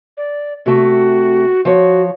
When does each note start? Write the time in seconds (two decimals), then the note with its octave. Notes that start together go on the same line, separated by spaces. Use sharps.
0.17 D5
0.66 C3 A3 F#4
1.65 F3 F#4 C#5